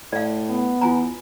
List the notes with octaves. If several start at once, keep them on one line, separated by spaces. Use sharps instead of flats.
A2 D5 F5
B3
E2 F4 G#5 A#5